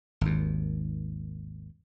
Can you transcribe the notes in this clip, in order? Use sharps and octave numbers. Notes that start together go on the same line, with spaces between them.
G#1 D#2